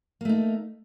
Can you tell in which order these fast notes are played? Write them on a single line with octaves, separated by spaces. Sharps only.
A#3 A3 D#4